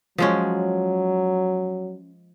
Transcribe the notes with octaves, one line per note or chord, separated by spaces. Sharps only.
F3 F#3 G#3 C#4